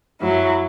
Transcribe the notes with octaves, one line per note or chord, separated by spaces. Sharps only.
F#2 F#3 E4